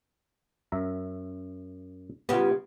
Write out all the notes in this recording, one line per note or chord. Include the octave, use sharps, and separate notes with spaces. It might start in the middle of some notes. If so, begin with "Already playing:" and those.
F#2 E5 A#5
C#3 B3 F4 G4